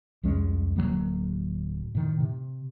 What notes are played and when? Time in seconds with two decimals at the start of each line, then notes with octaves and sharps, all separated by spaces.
0.23 C2 F2 G#3 C#4
0.77 D1 F#2 F#3 A#3
1.95 A2 D#3
2.20 C3